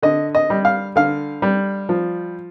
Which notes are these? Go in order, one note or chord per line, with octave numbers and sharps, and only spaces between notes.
D3 D#5
D#5
G3
F5
D3 F5
G3
F3